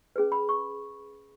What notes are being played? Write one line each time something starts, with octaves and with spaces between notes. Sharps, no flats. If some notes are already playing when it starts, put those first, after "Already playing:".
C#4 G#4 B4
B5
C#6